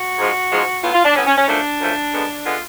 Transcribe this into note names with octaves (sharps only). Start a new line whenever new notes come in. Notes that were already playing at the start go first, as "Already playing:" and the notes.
Already playing: F#4
G#2 F3 G#3
G#2 F3 G#3
A2 F#3 B3 F4
F4
D4
A2 F#3 B3 C#4
C#4
C#4
F#2 F3 A3 D4
F#2 F3 A3
F#2 D3 G#3 B3
D3 G#3 B3 F4